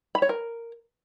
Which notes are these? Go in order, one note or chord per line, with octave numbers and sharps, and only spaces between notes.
B5
C#5
A#4